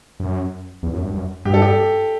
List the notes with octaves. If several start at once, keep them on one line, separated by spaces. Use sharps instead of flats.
F#2
E2
F#2
G2
F#2
G2 G4
A4
G4